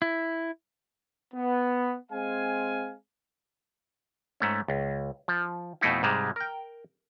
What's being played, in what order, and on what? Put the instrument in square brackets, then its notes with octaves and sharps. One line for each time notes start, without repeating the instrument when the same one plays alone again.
[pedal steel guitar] E4
[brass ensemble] B3
G#3 C4 F5 G#5
[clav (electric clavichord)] G#2 A3 C#4
C#2
F3
F2 B2 A3 D#4 E4
G#2 C3 G3 G#3
A#4 G5